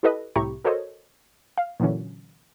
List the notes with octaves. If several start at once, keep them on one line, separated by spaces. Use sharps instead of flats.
E4 G4 A4 B4 D#5
C2 A2 E4 G4 A#5 C#6
F#4 A4 A#4 C5 C#5 D#5
F5
A#2 D3 E3 F#3 C#4